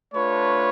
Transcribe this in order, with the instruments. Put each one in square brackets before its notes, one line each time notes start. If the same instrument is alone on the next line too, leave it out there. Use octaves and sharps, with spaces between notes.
[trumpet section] A3 D4 F4 B4 C#5